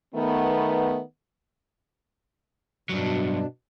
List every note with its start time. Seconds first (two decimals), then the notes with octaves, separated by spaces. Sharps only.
0.15 D#3 A3 B3
2.89 G2 B2 F#3 D4